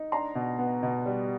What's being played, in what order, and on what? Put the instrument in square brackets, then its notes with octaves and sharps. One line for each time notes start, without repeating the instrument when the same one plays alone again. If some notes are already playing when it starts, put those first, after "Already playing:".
Already playing: [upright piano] D#4
D4 A#5 C6
B2
B3
B2
G3